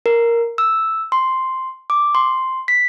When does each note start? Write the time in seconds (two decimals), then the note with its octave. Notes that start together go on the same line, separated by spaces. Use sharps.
0.06 A#4
0.58 E6
1.12 C6
1.90 D6
2.15 C6
2.68 B6